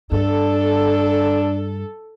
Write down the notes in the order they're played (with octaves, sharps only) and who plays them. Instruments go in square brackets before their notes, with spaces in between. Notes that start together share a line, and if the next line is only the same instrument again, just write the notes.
[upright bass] G2 [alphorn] D4 [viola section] A4